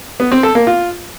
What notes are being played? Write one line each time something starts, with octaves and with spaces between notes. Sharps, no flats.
B3
C4
A4
A#3
F4